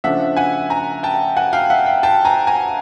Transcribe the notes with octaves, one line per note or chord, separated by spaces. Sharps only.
C#3 F3 A3 D4 E5 F#5
F#5 G#5
G#5 A#5
G5 A5
F#5 G#5
F5 G5
E5 F#5
F5 G5
G5 A5
G#5 A#5
G#5 A#5